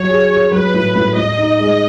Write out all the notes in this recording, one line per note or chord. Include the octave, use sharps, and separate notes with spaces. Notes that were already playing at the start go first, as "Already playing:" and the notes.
Already playing: F#3 C#5
G#4
G#4
F#3 B4
A2
A2
A2 D#5
D#4
G#3